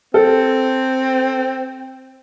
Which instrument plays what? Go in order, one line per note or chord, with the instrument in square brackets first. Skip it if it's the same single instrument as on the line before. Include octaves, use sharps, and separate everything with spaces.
[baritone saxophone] C4 [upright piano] A4